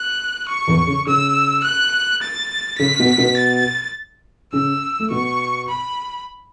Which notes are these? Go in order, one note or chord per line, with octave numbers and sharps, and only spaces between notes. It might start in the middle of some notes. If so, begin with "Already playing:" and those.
Already playing: F#6
C#6
E2 E3
C#3
C#3 E6
F#6
A6
C#3 B6
B2 B3
B2 B3
A6
C#3 C#4 E6
A3
B2 B3 C#6
B5